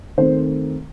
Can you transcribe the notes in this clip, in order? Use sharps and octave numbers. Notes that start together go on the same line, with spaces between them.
D#3 A3 C4 C5